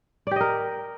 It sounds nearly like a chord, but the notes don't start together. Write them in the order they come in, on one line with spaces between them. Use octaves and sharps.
D5 G4 D#5 A#4